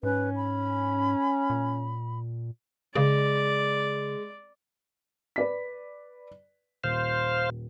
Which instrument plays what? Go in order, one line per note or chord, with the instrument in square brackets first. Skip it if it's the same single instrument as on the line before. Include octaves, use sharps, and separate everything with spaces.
[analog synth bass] G#2 [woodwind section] C#4 [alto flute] B4
[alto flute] B5
[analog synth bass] A#2
[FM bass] C#3 [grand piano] G#3 [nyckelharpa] D5
[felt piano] B4 D5 B6
[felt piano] D#1 [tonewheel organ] C5 F5